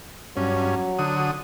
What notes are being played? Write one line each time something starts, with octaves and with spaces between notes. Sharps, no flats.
G2 F#3 C#4
D3 F#4 D#6